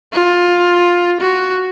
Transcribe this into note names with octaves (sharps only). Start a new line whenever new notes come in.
F4
F#4